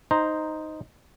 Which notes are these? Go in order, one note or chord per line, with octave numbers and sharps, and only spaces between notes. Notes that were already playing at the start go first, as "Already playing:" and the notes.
D#4 C5 A#5